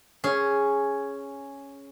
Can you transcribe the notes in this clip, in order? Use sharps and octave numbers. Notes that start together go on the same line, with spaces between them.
C#4 G#4